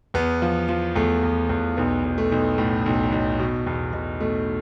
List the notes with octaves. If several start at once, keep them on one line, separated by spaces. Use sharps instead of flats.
E2 B3
F3
F3
E2 A3
E2
E2
B1 B3
B1
A3
B1
A2
B1
B1
B2
E2
B2
B2 A3